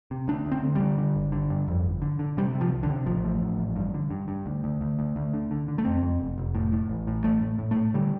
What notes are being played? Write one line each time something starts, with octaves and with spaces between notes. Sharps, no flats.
C3
D2 D4
D2
C4
D3
D3 G3
D3
G1
D3
G2
F2
G1
D3
D3
C3 G3
C3
F3
C2
D3
C3
A1 F3
A2
A2
A1
G2
D3
G2
G2
D2
D2
D2
D2
D2
D3
D3
D3
A3
F2 C4
F2
F1
F1
A2
A2
A1
A2
A1 A3
A2
A2
A3
A2
D3 G3